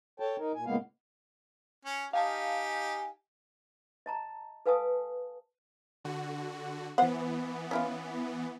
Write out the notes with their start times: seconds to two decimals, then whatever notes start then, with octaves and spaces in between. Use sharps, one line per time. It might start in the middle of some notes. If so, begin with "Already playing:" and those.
0.20 A4 C#5 G5 A5
0.39 D#4 A#4
0.55 A#2 G#5
0.66 A2 C#3 G#3 A#3 B3 F5
1.85 C#4
2.13 D#4 G4 F5 G#5 A5
4.06 D#5 A5 A#5
4.66 A4 B4 F5 G#5 A5 D#6
6.05 D3 F#4
6.98 E3 B3 C5 F#5
7.71 C#4 E4 F4